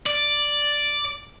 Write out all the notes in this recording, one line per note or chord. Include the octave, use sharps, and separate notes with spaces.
D5